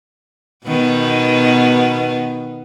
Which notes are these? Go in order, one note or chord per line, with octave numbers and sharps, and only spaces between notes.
B2 D#3 B3